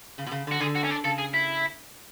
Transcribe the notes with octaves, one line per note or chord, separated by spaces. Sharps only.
C#3
B2
C#3
D3
F#4
D3 G#4
F#4
C#4
D4
C#3 A4
G#4
E4